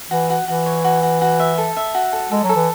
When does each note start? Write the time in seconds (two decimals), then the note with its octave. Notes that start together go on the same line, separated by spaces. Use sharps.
0.11 E3 F#4
0.30 F#4
0.47 E3 F#4
0.66 C#5
0.84 F#4
1.03 F#4
1.21 F#4
1.39 E5
1.58 A4
1.77 E5
1.95 F#4
2.13 A4
2.31 G#3 A4
2.44 F#3
2.49 A4
2.56 E3